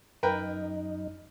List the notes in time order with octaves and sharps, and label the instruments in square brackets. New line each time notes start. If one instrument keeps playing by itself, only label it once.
[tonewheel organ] F#2 D#4 [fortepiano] A#4 B4 G5